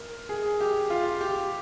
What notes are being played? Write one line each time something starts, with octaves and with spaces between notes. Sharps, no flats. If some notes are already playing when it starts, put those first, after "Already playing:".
Already playing: A#4
G#4
G4
F4
G4